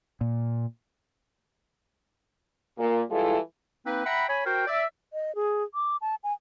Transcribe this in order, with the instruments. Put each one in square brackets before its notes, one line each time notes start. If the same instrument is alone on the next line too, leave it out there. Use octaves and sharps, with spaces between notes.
[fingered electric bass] A#2
[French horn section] A#2
E3 G3 G#3 E4 F4 A4
[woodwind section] A#3 C4 D#4 B4
E5 F#5 G5 A#5 B5
C#5 G#5 B5
F#4 A#4 C5 G5
D5 E5
[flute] D#5
G#4
D6
A5
G#5